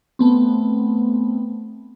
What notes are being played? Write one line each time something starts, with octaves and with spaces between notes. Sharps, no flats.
A3 B3 C4